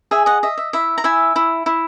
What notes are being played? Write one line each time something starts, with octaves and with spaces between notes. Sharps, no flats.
G#4 E5 G#5
D#5 F#5
D#5 E5
E5
E4 E5
A#5
E4 E5 G#5
E4
E4